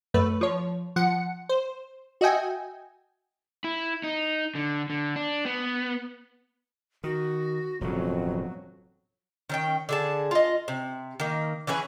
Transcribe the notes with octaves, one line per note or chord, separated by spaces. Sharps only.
F#2 A3 B4
F3 C#5
F3 F#5 C#7
C5
F#4 D#5 E5 G5 G#5
E4
D#4
D3
D3
D4
B3
D#3 F#4
E1 F2 A2 C#3 F#3
D#3 C#4 G5
D3 G#4 A5
F4 D#5
C3
D#3 A#3
E3 C#4 G#4 B4